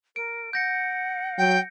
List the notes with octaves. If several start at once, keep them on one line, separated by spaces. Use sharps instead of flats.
A#4 D7
F#5 G6 A#6 C#7
F#3 G5